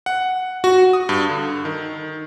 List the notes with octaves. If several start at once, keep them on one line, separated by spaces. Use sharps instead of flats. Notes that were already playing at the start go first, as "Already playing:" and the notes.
F#5
F#4
D#6
G2
D3
D#3